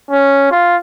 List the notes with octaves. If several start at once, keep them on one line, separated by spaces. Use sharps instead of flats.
C#4
F4